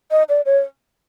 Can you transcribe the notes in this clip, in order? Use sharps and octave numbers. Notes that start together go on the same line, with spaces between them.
D#5
D5
C#5